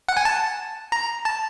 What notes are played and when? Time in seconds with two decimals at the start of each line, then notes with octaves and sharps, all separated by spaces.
0.08 F#5
0.17 G#5
0.25 A5
0.92 A#5
1.25 A5